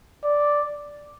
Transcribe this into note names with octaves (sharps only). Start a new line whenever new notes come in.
D5